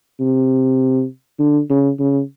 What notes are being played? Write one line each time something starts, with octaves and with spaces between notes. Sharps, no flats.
C3
D3
C#3
C#3